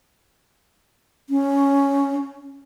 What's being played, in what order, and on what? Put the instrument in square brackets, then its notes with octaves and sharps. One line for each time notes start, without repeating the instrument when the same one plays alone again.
[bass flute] C#4